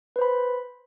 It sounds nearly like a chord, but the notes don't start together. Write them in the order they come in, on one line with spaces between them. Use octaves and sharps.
B4 C5 B5